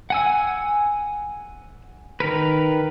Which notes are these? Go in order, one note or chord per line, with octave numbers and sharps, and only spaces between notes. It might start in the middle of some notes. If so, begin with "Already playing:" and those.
F#5 G#5 E6
D#3 A#4 B4